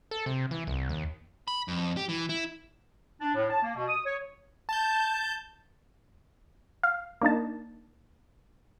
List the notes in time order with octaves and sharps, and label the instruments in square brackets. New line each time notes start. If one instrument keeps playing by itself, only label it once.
[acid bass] A4
C3
E3
C2
D#2
[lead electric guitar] B5
F2
G4
E3
E4
[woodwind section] D4
A2
A5
A#3
B2
D#6
C#5
[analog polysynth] A5 G6
[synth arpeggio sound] F5
A#3 D4 D#4 A5